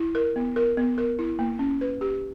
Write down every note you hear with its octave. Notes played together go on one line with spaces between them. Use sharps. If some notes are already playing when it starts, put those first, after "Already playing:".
Already playing: E4
A#4
B3
A#4
B3
A#4
E4
A#3
C#4
B4
G4